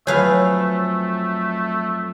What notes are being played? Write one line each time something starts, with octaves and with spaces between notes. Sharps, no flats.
F2 F#3 A3 G#4 B4 C#5 F5 A5